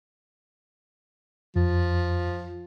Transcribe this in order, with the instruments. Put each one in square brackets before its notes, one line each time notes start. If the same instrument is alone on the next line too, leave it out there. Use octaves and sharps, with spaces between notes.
[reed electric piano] F2 [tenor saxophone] F3